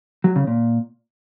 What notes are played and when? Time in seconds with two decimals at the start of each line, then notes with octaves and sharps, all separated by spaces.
0.24 F#3
0.36 C#3
0.47 A#2